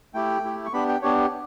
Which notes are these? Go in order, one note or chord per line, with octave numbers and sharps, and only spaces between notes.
A3 E4 G4 G5
A3 E4 G4
C#6
B3 D4 G4 B5
G5
B3 D4 G4 C#5